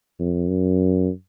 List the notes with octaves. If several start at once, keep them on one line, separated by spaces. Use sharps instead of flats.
F2
F#2